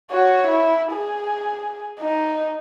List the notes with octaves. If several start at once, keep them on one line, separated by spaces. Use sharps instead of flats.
F#4 C#5
E4
G#4
D#4